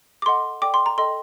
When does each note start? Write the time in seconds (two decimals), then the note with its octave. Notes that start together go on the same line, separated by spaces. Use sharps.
0.22 D6
0.26 A4 D#5 F#5 C6
0.62 A4 D5 G5 D6
0.74 C6
0.86 A#5
0.98 A4 D#5 G5 C6